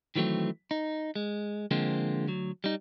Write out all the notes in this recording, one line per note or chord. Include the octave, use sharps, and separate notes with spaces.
D#3 E3 F#3 A3 C4
D#4
G#3
D3 F3 G#3 A#3 C4
D2 F#3
G3 D#4